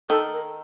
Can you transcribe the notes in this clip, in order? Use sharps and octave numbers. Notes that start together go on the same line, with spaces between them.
D#3 A4
A#4